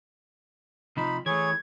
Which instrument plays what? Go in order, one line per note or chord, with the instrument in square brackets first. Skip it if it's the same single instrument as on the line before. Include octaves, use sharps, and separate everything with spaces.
[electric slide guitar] C3 F3 [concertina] D#4 B5
[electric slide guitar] E3 A3 [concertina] G#4 C#5 [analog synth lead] G#6